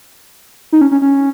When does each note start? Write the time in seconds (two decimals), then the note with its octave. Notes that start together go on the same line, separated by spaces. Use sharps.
0.72 D#4
0.81 C#4
0.91 C#4
1.02 C#4